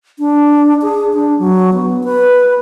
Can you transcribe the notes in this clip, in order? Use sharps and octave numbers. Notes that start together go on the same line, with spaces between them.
D4
G#4
D4
F#3
B3
B4